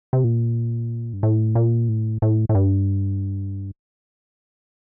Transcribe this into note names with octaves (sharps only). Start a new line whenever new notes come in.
C3
A#2
G2
A2
A#2
A2
A2
A2
G2